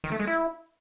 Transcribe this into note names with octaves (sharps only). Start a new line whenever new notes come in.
D#3
A3
G#3
E4